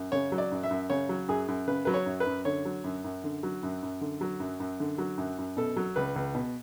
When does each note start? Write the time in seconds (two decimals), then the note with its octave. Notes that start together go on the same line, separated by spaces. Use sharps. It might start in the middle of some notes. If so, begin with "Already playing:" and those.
Already playing: F#2
0.12 C#3 C#5
0.32 F#3
0.38 D5
0.52 F#2
0.63 E5
0.71 F#2
0.90 C#3 C#5
1.09 F#3
1.28 F#2 G#4
1.48 F#2
1.68 C#3 B4
1.85 F#3 B4
1.94 C#5
2.06 F#2
2.20 B4
2.27 F#2
2.45 D3 C#5
2.65 F#3
2.84 F#2
3.04 F#2
3.24 D3
3.43 F#3
3.63 F#2
3.83 F#2
4.01 D3
4.21 F#3
4.40 F#2
4.60 F#2
4.80 D3
4.98 F#3
5.18 F#2
5.38 F#2
5.57 B2 A4
5.77 F#3
5.96 C#2 B4
6.16 C#2
6.35 B2